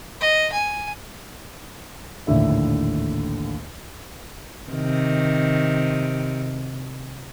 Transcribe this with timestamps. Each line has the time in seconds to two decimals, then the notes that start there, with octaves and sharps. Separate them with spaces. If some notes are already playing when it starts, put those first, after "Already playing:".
0.21 D#5
0.52 G#5
2.27 A#1 D#2 A2 D3 E5
4.71 C3 D#3